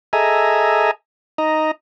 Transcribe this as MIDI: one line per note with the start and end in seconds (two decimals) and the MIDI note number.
0.13 0.91 68
0.13 0.91 69
0.13 0.91 75
0.13 0.91 76
0.13 0.91 80
0.13 0.91 82
1.38 1.71 63
1.38 1.71 75
1.38 1.71 82